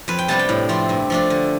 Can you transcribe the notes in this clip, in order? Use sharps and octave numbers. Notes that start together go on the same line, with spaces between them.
F2 B4
G5
C3 G3 B3 D4 A5
G5
A2
F3 A3 C4
G2
F3 A3 D4
D3